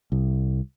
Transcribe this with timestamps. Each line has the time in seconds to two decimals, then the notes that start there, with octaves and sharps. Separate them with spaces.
0.12 C2